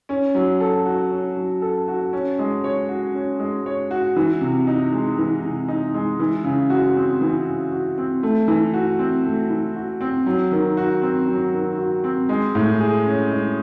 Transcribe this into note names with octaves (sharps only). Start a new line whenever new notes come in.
C#4
F#3
A4
F#4
C#4
F#3
A4
F#4
C#4
G#3
C#5
F#4
C#4
G#3
C#5
F#4
E3
C3
D#4
G#3
E3
C3
D#4
G#3
E3
C#3
F#4
C4
E3
C#3
F#4
C4
A3
E3
F#4
C4
A3
E3
F#4
C4
F#3
D#3
F#4
C4
F#3
D#3
F#4
C4
G#3
A2
G#4
C#4
G#3